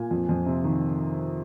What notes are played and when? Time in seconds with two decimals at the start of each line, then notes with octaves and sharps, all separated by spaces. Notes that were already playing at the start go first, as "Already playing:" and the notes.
Already playing: A#2 G#5
0.11 F2
0.29 F2
0.46 C3
0.64 D#3